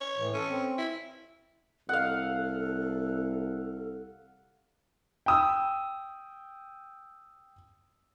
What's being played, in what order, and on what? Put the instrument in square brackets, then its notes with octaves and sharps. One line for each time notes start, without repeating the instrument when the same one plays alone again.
[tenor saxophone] C#5
[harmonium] A2 E3
[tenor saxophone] C#4 [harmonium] A4
[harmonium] C4
[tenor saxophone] E4
[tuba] C2 [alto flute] A4 [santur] F5 F#5
[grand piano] G5 D#6 E6